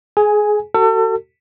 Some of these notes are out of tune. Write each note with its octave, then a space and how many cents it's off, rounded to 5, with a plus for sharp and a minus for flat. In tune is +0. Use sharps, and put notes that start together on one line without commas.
G#4 +20 G#5 +0
F#4 +35 A4 +35